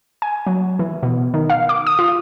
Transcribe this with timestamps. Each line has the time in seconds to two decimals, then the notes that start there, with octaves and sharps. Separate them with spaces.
0.22 G#5
0.47 F#3
0.79 E3
1.03 B2
1.34 D#3
1.50 F5
1.69 D6
1.87 D#6
1.99 F4